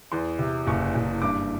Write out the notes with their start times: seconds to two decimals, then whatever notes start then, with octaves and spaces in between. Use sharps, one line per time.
0.12 E2 C6
0.39 C3
0.67 F#1 C#6
0.95 F#1
1.22 G2 D6